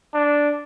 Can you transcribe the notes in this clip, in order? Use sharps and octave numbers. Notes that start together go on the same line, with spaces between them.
D4